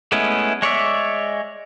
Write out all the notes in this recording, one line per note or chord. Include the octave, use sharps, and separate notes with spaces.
G#3 A3 B3 C#4 E4
G#3 C#5 D5 E5